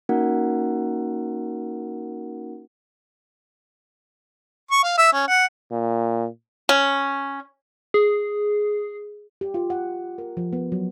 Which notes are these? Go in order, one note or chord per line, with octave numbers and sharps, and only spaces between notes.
A#3 C#4 D#4 F#4 A#4 F#5
C#6
F5
E5
C#4
F#5
A#2
C#4
G#4
G4
F4
F#5
A#4
F3
B3
F#3